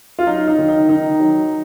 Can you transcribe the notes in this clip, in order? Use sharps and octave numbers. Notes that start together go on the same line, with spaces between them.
F4
F#3 D#4
D#4
D#3
D#4
D#3 D#4
F#3